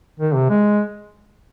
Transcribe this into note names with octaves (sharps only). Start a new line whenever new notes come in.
D#3
C3
G#3